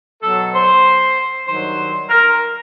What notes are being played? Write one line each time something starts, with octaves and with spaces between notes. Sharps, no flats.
B2 F#3 A4
C5
G2 D#3 F#3 C5
A#4